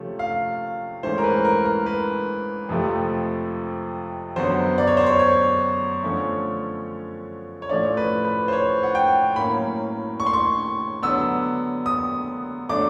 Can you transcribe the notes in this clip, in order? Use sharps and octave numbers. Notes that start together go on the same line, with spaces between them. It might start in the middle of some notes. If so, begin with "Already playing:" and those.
Already playing: C3 F3 A3 C#4
F5
G#2 E3 A3 C#4 C5
A#4
B4
A#4
A#4
B4
F2 C3 F3 A3
F#2 D3 F#3 B3 C5
D5
C#5
C5
C#5
C#5
D3 F3 A3 C#4
C#5
A2 F3 A3 C#4 D5
B4
B4
C5
C#5
F#5
G5
A2 F#3 A#3 C#4 B5
C#6
C6
C#6
D3 F#3 B3 E6
D#6
D3 F#3 A3 D4 D6